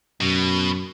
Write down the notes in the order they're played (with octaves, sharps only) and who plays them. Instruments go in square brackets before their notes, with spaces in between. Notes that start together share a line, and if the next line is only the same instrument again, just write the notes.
[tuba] F#2 [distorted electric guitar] B2